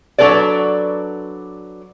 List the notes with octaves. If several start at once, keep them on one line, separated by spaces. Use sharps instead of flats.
F#3 D4 A4 B4 D5